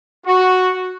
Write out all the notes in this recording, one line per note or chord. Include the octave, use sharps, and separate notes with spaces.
F#4